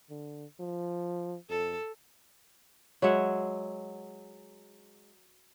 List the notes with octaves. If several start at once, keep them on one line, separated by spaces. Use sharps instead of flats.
D3
F3
F2 A4
F#3 G#3 E5 F#5